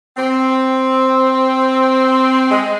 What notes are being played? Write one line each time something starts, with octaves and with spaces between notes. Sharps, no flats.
C4
G#3